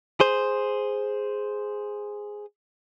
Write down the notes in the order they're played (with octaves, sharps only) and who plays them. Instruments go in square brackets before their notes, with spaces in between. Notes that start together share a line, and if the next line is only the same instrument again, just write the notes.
[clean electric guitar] G#4 C5